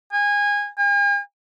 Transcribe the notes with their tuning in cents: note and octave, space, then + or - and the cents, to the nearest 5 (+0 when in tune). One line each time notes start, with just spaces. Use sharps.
G#5 -20
G#5 -45